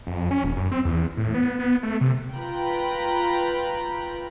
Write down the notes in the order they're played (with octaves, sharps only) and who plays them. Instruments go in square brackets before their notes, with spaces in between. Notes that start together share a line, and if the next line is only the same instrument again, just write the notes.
[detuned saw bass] F2
C#4
D#1
F#2
C4
E2
A2
B3
B3
A3
C3
[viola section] F4 B4 G5 A#5 B5